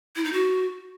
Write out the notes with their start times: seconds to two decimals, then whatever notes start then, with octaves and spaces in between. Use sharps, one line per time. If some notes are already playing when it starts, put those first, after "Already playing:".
0.16 E4
0.24 D#4
0.33 F#4